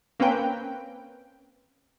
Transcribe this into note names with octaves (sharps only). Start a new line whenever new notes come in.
A#3 C4 C#4 B4 G5